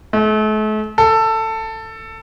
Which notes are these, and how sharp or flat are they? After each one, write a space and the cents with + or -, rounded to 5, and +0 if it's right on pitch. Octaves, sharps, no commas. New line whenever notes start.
A3 -40
A4 +15